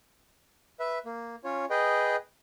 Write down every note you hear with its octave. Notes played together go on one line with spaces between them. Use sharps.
B4 E5
A#3
C#4 F4 C#5
G#4 B4 D#5 G5